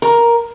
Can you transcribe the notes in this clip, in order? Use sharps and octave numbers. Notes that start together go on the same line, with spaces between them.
A#4